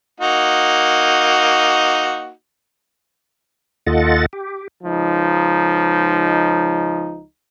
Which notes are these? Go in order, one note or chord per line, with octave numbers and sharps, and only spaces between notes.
A#3 D#4 F#4
D#2 F4 A4 D#5 F#5 A6
G4
C#2 F3 D#4